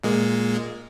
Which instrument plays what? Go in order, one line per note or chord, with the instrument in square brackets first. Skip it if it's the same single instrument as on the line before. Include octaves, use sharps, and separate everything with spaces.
[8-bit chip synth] A#2 G#3 A#3